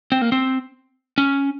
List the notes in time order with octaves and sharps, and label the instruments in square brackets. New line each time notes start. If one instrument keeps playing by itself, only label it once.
[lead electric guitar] C4
A#3
C4
C#4